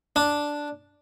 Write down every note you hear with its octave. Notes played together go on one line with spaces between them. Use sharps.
D4